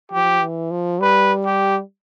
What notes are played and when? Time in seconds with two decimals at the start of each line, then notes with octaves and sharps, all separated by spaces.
0.12 F3 G4
0.41 E3
0.71 F3
1.01 G3 B4
1.46 G4